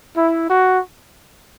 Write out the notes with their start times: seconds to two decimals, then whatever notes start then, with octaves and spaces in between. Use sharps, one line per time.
0.15 E4
0.49 F#4